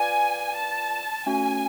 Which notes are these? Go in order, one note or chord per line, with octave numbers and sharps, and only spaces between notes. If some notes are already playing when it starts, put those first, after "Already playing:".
Already playing: F4 B4 D5 F5 G#5
A5
A3 C#4 F#4 G#5